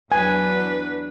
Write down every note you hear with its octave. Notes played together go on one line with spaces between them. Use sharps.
E2 F#3 D4 B4 G#5